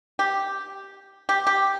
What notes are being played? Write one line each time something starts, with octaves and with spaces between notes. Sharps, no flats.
G4
G4
G4